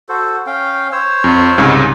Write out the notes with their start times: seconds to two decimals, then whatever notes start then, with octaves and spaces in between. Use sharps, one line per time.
0.09 F#4 A4 C5
0.47 C#4 F5 G5
0.92 C5 C#5 E6
1.24 F2
1.57 C2 G#2 C#3